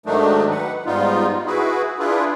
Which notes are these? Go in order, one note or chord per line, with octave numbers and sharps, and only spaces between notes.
G#2 D#3 F#3 A3 D4 D#4
B4 F#5
G#2 G3 B3 D#4 F4
E4 F#4 G#4 B4
D4 E4 F4 G#4 B4